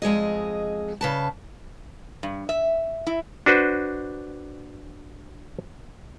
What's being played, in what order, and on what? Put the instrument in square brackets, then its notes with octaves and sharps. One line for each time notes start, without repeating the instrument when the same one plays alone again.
[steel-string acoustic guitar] F2 G#3 G#4 D#5
C#3 B4 A5
[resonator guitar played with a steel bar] G2
E5
E4
[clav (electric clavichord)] D4 F#4 B4 C5